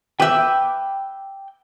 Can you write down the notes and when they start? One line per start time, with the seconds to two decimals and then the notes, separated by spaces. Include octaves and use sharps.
0.20 B4 E5 G5 D6 G6